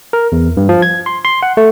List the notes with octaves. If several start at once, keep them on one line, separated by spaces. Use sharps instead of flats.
A#4
E2
G2
F3
G#6
C6
C6
F#5
A3